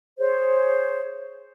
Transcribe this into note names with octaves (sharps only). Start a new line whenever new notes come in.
G#4 C5 C#5